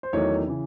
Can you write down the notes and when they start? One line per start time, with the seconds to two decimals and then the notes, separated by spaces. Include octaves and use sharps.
0.03 C5
0.13 E2 D#3 F#3 A3 D#4 C#5
0.47 C#3 E3